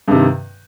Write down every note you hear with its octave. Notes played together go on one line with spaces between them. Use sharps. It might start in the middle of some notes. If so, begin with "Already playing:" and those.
G2 C3 D#3